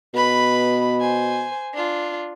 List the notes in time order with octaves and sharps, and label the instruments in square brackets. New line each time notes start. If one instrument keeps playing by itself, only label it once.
[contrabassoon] B2 [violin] B4 B5
[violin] C5 G#5
D4 F4